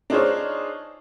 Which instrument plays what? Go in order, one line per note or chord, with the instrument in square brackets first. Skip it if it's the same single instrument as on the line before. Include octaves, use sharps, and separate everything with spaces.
[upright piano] D4 D#4 F4 G#4 C5 C#5